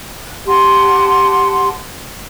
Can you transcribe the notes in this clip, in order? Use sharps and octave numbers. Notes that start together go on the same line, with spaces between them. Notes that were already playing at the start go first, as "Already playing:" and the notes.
G4 F#5 A5 C6